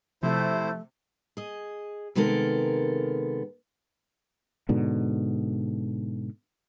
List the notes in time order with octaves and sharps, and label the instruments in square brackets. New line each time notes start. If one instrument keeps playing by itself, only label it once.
[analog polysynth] C3 [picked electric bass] F3 [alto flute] A3 [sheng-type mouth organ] E4 C5
[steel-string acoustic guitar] G#4 D#5
C3 D#3 G#3 B3 A4 A#4
[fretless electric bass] G#2 B2 D3